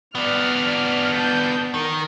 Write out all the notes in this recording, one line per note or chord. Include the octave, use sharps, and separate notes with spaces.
B3 D4 D5 F6
A5 G6
D#3 A#4